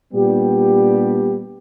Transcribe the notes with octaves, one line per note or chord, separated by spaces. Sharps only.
A#2 G3 B3 D4 G4